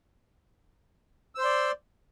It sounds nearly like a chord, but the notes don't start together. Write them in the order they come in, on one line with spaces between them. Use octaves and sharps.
E6 C5 C6 D5